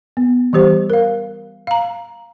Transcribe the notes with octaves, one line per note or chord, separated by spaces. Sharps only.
B3
E3 G3 G4 C5
A#4 F5
F5 A#5